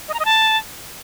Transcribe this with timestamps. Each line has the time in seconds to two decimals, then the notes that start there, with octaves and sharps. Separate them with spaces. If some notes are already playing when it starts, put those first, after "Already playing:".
0.08 D#5
0.14 A#5
0.20 D#5
0.25 A5